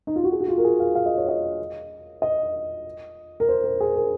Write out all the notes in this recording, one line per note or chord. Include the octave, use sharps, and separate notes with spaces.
D#4
F4
F#4
G#4
F#4
F4
A#4
G#4
F5
F5
D#5
C#5
D#5
D#5
A#4
C5
A#4
G#4
A#4